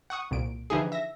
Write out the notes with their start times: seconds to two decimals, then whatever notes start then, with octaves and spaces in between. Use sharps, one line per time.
0.10 F#5 C#6 D#6
0.31 C2 A#2 D7
0.70 D3 E3 F3 D#4 G4 G#4
0.92 E5 A#6